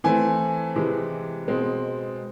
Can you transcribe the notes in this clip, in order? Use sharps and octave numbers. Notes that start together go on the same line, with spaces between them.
E3 A3 C4 G#5
C3 E3 G#3
B2 G#3 C4